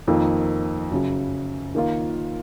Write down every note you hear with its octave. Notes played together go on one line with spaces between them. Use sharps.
F2 D#3 A#3
F#2 C#3 F#3
D#3 A#3 F4